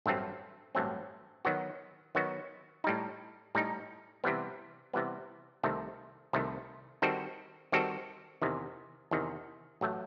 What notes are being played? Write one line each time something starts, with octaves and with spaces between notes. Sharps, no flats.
A1 G2 F#3 A3 C4
A1 G2 F#3 A3 C4
D#3 F#3 B3 F#4
D#3 F#3 B3 F#4
A2 G3 D#4
A2 G3 D#4
C3 E3 G3 B3
C3 E3 G3 B3
C2 C3 D#3 A3
C2 C3 D#3 A3
D#3 G3 C4 F#4 A4
D#3 G3 C4 F#4 A4
E2 C3 D#3
E2 C3 D#3
A1 F#3 A3